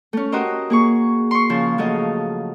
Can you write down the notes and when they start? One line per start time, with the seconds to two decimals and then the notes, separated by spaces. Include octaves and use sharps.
0.13 A3 C#4
0.32 F#4 G4 A#4 C5 D#5
0.70 A#3 G#4 C#6
1.31 C6 C#6
1.50 C#3 F3 G#4
1.78 F3 F#3 A3 D#5